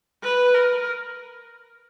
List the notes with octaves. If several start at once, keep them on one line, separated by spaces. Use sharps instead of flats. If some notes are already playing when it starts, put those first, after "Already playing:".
B4
A#4